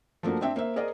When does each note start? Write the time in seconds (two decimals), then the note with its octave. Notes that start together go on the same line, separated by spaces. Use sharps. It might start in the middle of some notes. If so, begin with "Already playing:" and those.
0.23 F3 A3 A#3 D4 F#4
0.41 C4 D4 E5 G5
0.56 A#3 C5 E5
0.76 G#4 A#4 C5 D5 D#5